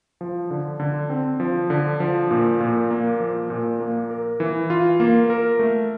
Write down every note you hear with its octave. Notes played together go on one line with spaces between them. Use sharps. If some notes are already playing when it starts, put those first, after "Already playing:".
F3
D3
D3
C4
F3
D3
F3
A#2
A#2
A#3
F3
A#2
A#3
A#4
E3
F4
A#3
A#4
A3